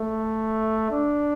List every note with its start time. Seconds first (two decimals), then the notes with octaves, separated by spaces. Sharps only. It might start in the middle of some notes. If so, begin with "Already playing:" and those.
Already playing: A3
0.92 D4